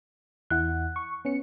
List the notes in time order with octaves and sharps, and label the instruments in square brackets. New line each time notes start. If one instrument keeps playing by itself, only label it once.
[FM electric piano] E2 E4 F#5 [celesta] F#6
[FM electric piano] C#6
B3 C#4 C#7